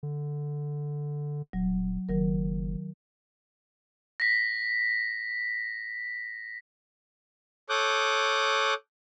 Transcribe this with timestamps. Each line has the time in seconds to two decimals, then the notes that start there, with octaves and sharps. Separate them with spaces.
0.03 D3
1.53 D#1 F#3
2.09 F#1 D#3 F#3 A#4
4.20 A#6 B6
7.70 A4 C#5 D6 D#6 F#6 G6